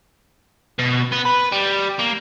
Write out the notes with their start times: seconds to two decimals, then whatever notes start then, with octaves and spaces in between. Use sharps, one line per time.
0.79 B2
1.12 B3
1.25 B4
1.52 G3
1.99 A#3